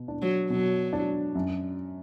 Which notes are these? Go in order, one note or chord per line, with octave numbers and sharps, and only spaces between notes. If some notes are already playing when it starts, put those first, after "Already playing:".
Already playing: B2
D4
F#3
B2 F#3
D4
F#2